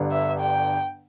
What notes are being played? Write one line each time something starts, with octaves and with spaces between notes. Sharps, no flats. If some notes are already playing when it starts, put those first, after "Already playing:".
Already playing: G1 G2 D3
E5
G5